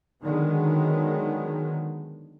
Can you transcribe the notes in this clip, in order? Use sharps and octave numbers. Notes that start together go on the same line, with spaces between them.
D3 D#3 F#3 G#3 B3